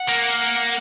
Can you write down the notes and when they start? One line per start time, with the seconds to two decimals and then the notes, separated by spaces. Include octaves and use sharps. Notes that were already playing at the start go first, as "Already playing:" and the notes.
Already playing: F#5
0.09 A#3